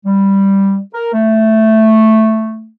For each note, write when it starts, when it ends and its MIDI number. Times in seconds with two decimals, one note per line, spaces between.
0.05 0.79 55
0.94 1.09 70
1.14 2.69 57